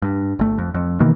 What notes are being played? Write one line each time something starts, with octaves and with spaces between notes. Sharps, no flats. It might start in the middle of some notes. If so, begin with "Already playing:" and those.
G2
G1 A3
F2
F2
B2 D#3 E3 A#3